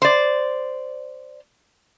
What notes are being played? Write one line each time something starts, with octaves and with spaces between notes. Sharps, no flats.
C5 D5